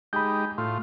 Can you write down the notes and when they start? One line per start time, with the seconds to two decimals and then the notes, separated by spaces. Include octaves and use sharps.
0.13 G#3 D#4 G4 B5 G6
0.58 A2 F4 C6